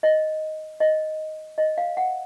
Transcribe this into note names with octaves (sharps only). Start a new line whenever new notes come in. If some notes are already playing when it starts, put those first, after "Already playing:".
D#5
D#5
D#5
F5
F#5